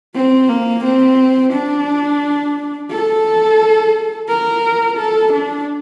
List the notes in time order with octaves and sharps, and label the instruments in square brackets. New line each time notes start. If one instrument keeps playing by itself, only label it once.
[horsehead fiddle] C4
A#3
C4
D4
A4
A#4
A4
D4